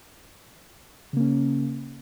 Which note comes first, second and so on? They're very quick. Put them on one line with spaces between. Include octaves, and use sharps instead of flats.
C#3 A#3 C#4